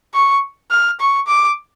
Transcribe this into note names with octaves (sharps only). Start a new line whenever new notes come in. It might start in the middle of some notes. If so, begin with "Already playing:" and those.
C#6
F6
C#6
D6